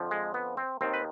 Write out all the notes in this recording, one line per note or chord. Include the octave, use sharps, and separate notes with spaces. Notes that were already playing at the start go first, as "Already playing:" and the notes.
Already playing: F2 D3 F3
G#3
B3
C4
D#2 D#3 C4
B4